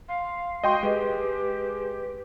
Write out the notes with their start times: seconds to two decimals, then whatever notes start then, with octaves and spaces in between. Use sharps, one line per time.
0.09 F5 C6
0.64 G#3 F#4 D#5 G5 C6
0.83 G#3 G4 B4